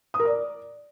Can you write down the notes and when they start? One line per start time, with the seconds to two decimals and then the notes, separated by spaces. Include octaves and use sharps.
0.14 D#6
0.20 A#4
0.25 D5